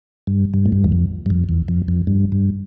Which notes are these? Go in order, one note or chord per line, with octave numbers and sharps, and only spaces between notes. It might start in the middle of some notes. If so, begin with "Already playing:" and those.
G2
G2
A2
G2
E2
F2
G2
F2
E2
F2
F2
G2
G2